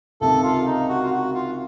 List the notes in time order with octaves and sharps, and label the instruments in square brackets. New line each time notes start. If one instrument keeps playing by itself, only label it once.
[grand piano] C#2 C3 D#3 [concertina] A4
[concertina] F4
D#4
F#4
F4
F#4
F4